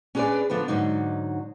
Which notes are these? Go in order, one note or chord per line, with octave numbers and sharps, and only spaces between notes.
C#4 D4 G#4 A4 B4 D5
D3 F3 B3 B4
G#2 D3 F#3 D#4